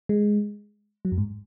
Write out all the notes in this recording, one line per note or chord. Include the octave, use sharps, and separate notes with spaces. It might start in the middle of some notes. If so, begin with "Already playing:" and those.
G#3
F#3
F#2
G#2